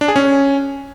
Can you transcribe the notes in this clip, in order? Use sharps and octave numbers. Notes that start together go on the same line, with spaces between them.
D4
G#4
C#4